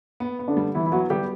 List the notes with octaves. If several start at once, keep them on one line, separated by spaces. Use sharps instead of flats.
B3
B3
D3 D4
G3
E3 B3 E4
E4
F#3 B3 F#4
G3 B3 G4